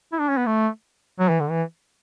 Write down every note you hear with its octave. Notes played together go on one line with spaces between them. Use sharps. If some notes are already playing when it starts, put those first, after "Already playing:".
E4
D4
C#4
B3
A3
F#3
E3
D3
E3